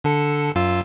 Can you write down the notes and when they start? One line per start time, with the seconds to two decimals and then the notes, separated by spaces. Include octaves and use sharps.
0.04 D3 A4 C#7
0.55 F#2 F4 E6